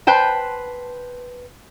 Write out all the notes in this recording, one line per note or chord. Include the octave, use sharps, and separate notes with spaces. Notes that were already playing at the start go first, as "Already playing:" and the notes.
B4 C5 G5 A5